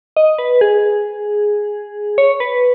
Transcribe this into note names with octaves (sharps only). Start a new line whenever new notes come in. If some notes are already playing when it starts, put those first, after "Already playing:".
D#5
B4
G#4
C#5
B4